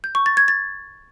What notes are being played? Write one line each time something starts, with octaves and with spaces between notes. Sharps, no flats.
G6
C#6
A6
G#6
A6